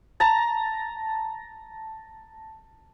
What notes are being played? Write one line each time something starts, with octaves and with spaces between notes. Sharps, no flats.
A5 A#5